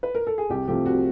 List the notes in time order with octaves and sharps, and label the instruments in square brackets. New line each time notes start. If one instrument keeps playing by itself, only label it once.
[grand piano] B4
A#4
A4
G#4
C2 G4
C3 F3 A3 C4 G4
C2 F#4